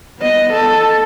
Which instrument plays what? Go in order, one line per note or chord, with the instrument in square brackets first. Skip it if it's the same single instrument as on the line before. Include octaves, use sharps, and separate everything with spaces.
[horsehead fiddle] B3 D#5
A4